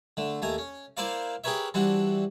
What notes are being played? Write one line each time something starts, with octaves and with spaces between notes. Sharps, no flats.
D3 A3
D#2 A3 G#5 A#5
C#4
A#3 E4 A#4 C5 D5 F5
G4 G#4 A#4 B4 C#5 E5
E3 G3 C4 D4 F#4